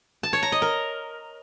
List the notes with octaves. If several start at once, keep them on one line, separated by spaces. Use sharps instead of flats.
A5
C#5
A#5
D#5
A#4